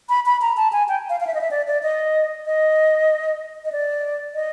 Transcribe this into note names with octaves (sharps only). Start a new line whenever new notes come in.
B5
B5
A#5
A5
G#5
G5
F5
F5
E5
D#5
E5
D5
D5
D#5
D#5
D#5
D5
D#5